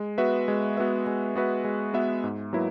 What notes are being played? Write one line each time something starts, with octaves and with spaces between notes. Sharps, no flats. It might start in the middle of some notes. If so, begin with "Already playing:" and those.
Already playing: G#3
B3 F#4 B4 E5
G#3
B3 F#4 B4 E5
G#3
B3 F#4 B4 E5
G#3
B3 F#4 B4 E5
G#2
F#3 A#3 E4 B4